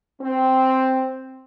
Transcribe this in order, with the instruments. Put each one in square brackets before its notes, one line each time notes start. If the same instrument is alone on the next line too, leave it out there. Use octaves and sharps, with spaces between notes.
[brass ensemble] C4